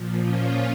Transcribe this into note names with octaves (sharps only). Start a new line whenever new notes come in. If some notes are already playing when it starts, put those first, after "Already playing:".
Already playing: A#2 F3
C#4 F4